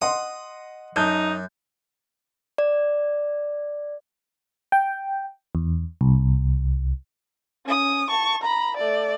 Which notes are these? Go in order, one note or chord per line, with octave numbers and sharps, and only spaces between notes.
D#5 F#5 C6 D#6
F#2 D#4 A5 D#6 G6
D5
G5
E2
C2
C#4 D#6
A5 C#6
A#5 B5
A3 D5